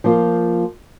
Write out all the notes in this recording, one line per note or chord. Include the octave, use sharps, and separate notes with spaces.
F3 A#3 F4